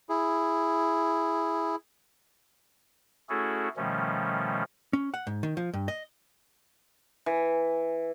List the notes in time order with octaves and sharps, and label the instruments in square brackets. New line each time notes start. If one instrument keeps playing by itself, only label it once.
[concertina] E4 G#4
[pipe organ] A3 C#4 E4 F#4 G#4 A4
B2 D#3 F3 G3 A3 C#4
[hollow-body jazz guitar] C#4
F#5
G#2
D#3
F3
G2
D#5
[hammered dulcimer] E3